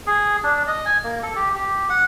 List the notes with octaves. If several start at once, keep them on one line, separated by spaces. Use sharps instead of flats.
G#4
D4
D#5
G#5
A#3
A4
G4
G4
F#5